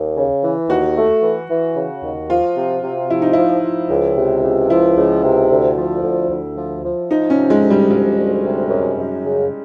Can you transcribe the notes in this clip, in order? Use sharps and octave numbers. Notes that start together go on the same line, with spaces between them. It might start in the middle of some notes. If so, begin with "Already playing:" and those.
Already playing: D#2
C#3
E3
D#2 F#4
A3
E3
E3
C#3
D#2
F3 F4
C3
C3
F3 E4
D#4
F3 E4
F3
C#2
C3
C#2
F3 E4
C#2
C3
D2
F3
D2
D2
F3
F3
F3 D#4
C#4
C3
G#3
D2
G3
F3 G3
D2
C3
F#2
F#2
C#3